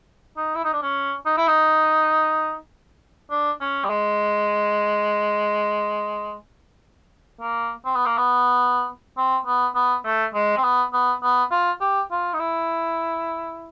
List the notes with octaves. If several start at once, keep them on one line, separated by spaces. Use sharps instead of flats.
D#4
E4
D#4
D4
C#4
D#4
E4
D#4
D4
C#4
G3
G#3
A#3
C4
B3
A#3
B3
C4
B3
B3
A3
G#3
C4
B3
B3
B3
F4
G4
F4
D#4
E4